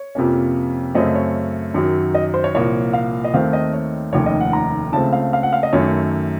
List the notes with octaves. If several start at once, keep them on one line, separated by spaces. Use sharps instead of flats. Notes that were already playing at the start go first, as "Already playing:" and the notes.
Already playing: C#5
F2 C3 F3 A#3 C#4
F#2 C#3 A3 C4 D#5
C#5
F#2 D#3 F#3
D#5
C5
C#5
C2 A#2 F3 A#3 C#5
F5
D#5
D#2 D#3 A3 C4 F5
D#5
C#5
F1 D#2 D#3 A3 C#4 C#5
D#5
F#5
A#5
C#2 C#3 A3 C4 A5
F5
F5
F#5
F5
D#5
F#2 D#3 A3 C#5